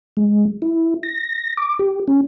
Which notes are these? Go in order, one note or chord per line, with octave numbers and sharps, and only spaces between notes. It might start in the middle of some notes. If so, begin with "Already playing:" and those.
G#3
E4
A#6
D6
G4
C#4